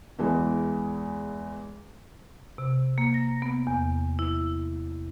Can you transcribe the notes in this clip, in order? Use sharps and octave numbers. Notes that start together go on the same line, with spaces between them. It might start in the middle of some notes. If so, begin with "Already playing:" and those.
E2 E3 G#3
C3
A#3
A#6
B3
E2
E4